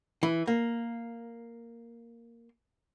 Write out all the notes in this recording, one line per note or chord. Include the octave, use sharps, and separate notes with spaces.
E3
A#3